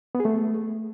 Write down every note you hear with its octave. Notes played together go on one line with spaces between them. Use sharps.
B3
G#4
A3